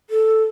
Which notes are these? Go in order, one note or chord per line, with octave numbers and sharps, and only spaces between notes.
A4